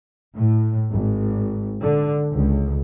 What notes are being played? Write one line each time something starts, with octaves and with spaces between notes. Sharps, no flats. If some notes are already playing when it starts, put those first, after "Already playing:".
A2
G#1
D3
C#2